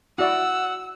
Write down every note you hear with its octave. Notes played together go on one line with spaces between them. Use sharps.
E4 F#4 D5 F#5 E6